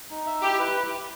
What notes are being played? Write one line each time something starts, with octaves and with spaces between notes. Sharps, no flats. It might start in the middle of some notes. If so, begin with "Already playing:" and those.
D#4
E5
E4 G4
B4